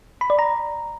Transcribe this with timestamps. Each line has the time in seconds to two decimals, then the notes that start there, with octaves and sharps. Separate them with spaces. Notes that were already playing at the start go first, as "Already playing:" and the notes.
0.21 B5
0.30 D5
0.39 A#5